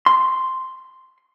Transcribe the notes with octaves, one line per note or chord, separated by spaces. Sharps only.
C6